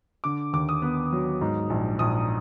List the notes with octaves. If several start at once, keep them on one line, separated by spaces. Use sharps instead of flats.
D3 D6
D#2 D6
D#6
B3
F#3
G#2
A#1
A#1 D#6